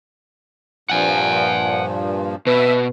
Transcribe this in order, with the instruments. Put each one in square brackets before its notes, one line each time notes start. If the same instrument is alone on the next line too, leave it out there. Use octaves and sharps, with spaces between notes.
[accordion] G2 A#2 F3 [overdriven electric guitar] F#5 G#5
[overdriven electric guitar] B2 [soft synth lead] B4 [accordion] E5